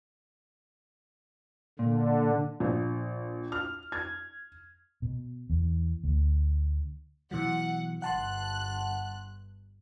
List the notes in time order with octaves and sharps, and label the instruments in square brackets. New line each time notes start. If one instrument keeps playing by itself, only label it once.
[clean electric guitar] A#2 [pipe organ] D3
[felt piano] A#1
F6
G#6
[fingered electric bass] B2
E2
D2
[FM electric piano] B2 E3 F#3 [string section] F#5
[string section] G1 F#6 [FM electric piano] F#5 A5 C6